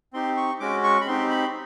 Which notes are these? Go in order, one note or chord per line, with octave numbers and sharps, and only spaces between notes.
C4 D#4 G4 C6
C#6
G#3 C#4 F#4 D6
C#6
B5
C4 D#4 G4 C6
B5